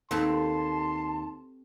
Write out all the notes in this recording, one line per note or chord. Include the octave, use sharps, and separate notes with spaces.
D#2 C4 A4 B4 A5 C6